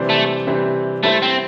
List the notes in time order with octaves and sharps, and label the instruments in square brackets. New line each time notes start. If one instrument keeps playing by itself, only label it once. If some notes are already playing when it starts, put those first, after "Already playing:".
Already playing: [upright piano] C3 E3 G3 D4 C5
[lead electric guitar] A3
[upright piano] C3 E3 G3 D4 C5
[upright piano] G3 E4 C5 E5 [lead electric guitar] A3
[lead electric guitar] C4